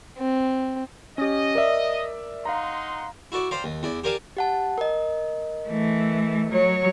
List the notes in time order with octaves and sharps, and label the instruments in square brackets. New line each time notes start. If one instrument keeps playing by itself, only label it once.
[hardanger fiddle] C4
[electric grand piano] C#4 G4 [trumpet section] D#5
[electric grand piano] A#4 D5 E5
[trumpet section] D#4 F#5 C6 [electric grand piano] F5 A#5
[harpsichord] E4 F#4 A4 D5
C5 D5 F5 G5 A#5
D#2
E2 E4 D5
G4 A#4 D5 F5 G#5 A5
[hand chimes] G4 F#5 A5
A#4 D#5
[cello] E3 A3
F#3 C#5